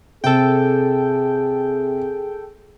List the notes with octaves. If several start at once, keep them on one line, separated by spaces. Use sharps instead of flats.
C3 G#4 A4 G5